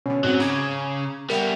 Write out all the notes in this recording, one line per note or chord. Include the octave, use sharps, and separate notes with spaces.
B2 D3 C#4
G#2 F#3 C4 D#7
C#3 A#5 D6 G#6
G3 B3 A#4 E5 G5